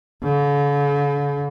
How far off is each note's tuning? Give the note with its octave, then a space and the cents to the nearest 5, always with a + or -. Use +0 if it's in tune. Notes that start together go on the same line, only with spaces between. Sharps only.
D3 -45